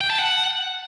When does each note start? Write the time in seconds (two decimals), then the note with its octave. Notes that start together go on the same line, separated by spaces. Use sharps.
0.01 G5
0.10 A5
0.19 F#5